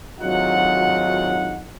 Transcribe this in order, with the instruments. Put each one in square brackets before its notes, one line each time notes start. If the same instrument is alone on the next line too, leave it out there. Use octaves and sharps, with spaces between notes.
[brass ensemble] G#1 D2 F#3 D#4 F4 F#5